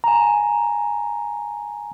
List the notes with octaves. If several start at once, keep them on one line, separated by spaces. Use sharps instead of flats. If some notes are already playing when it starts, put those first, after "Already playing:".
G#5 A#5